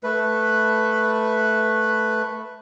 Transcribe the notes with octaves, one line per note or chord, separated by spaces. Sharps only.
A3 B4